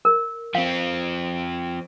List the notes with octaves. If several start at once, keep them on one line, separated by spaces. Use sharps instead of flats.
A#4
F3 C4 F5